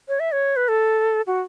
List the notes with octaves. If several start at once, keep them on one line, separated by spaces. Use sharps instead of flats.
C#5
E5
C#5
B4
A4
F#4